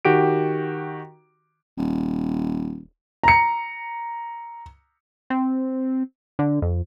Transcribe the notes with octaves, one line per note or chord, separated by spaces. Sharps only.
D#3 F#4 G4 D7
D#1
A#5 C#7
C4
D3
F2